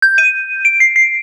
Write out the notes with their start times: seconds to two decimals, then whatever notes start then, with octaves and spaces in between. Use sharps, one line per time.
0.02 G6
0.18 D#7
0.65 D7
0.80 C7
0.96 C7